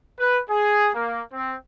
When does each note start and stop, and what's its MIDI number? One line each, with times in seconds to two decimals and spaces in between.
0.19 0.40 71
0.50 0.91 68
0.94 1.24 58
1.33 1.55 60